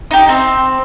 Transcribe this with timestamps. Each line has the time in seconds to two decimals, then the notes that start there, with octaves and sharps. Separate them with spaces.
0.11 D#4 G4
0.29 C4